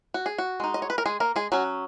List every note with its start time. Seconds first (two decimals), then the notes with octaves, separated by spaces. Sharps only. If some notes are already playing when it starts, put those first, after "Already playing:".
0.14 F#4
0.26 G#4
0.38 F#4
0.60 G#3 D#4
0.74 D#5
0.82 C#5
0.90 B4
0.98 A#4
1.06 G#3 G#4
1.20 A#3 A#4
1.36 G#3 G#4
1.52 F#3 C#4 F#4